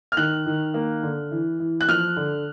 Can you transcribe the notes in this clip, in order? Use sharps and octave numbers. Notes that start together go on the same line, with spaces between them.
F6
D#3 F#6
D#3
A#3
D3
E3
E3
F#6
F3 F6
D3